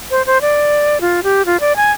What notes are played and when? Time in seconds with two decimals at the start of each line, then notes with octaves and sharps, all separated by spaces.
0.11 C5
0.26 C5
0.41 D5
1.01 F4
1.23 G4
1.46 F4
1.60 D5
1.76 G#5